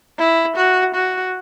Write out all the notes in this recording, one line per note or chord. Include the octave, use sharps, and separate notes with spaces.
E4
F#4
F#4